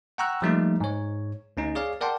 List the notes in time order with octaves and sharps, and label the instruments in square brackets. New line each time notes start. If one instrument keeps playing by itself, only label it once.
[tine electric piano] F#5 G5 A#5 C#6 E6 F#6
F3 G3 A3 A#3 D#4
G#2 C#5
D2 C#4 D#4
G#4 C#5 D5 F5
A#4 D5 F#5 G5 A5 C6